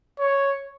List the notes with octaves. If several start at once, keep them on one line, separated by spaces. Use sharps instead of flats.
C#5